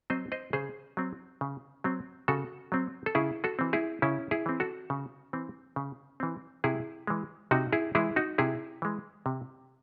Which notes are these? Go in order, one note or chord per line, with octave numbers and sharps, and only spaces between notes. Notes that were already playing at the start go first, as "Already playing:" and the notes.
F#3 C4 C5 D#5
C5 D#5
C#3 G#4 C5
F#3 C4
C#3
F#3 C4
C#3 F#4 A4
F#3 C4
A4
C#3 E4 G#4
F#4 A4
E3 C4
E4 G#4
C#3 C#4 E4
E4 G#4
E3 C4
F#4 A4
C#3
E3 C4
C#3
E3 C4
C3 E4 G#4
E3 G#3
C3 D#4 F#4
E4 G#4
E3 G#3 E4 G#4
D#4 F#4
C3 E4 G#4
E3 G#3
C3